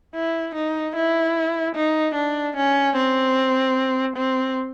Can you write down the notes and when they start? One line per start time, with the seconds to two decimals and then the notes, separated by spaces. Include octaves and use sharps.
0.15 E4
0.55 D#4
0.96 E4
1.75 D#4
2.15 D4
2.56 C#4
2.96 C4
4.16 C4